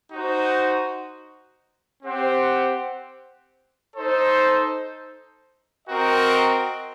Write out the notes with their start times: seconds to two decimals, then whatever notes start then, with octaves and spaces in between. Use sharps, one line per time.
0.11 D#4 F#4 C5
2.03 C4 G4 C5 F#5
3.95 D#4 A4 C5
5.88 C4 F#4 A#4 D#5 G5